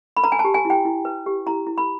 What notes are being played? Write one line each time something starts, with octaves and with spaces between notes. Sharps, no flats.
B5
B4 A#5
G#5
A5
G4
G#5
E4 G5
E4
B4
G4
E4 A#5
E4
B5